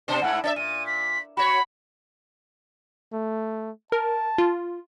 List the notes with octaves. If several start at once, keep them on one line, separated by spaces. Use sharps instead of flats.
B2 D4 C5
G#2 A3 E4 F#5
D4 C#5 E5 A6
A#2 D#7
B6
F#4 C#5 B5
A3
A#4 A5
F4